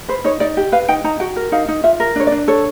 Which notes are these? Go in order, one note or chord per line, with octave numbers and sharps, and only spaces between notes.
B4 C5
D#4 C#5
D#4 D5
G4
B4 F5
D#4 G5
D#4 A#5
F#4 G5
A#4
D#4 F5
D#4
F4 E5
A#4
D4 C#5
D5
D4
A4 C#5